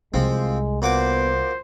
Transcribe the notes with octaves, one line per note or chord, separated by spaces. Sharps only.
C2 F3 G#3 C4
A#2 B3 F#4 C5 D6